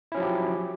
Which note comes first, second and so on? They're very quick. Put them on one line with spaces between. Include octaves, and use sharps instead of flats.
E4 C#4 F#3 F3 G4